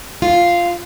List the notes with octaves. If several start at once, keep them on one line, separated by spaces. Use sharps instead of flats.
F4